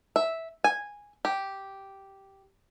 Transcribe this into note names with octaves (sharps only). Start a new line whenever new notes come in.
E5
G#5
G4